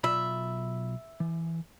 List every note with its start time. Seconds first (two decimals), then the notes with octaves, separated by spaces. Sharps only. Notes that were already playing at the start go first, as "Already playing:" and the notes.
0.04 B1 F4 E5 B5
1.20 E3